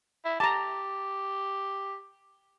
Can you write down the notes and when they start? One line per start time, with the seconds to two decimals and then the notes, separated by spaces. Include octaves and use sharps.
0.25 E4
0.40 G4 A5 A#5